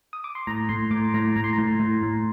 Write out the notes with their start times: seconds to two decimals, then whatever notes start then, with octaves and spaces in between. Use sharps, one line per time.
0.13 D#6
0.24 D6
0.35 C6
0.47 A2 A#5
0.69 A2 C6
0.91 A2 D6
1.14 A2 A#5
1.36 A2 A#5
1.44 C6
1.53 A#5
1.58 A2
1.80 A2
2.03 A2